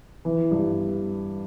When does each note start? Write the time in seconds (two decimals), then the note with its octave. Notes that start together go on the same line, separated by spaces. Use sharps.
0.25 E3
0.51 G2